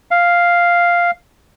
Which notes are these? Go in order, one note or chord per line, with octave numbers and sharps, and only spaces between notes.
F5